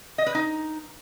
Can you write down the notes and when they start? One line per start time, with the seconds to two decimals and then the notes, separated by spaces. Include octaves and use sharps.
0.18 D#5
0.27 B4
0.35 D#4